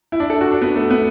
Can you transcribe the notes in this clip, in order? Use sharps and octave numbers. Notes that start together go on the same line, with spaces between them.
E4
D4
A4
F#4
D4
B3
A3
B3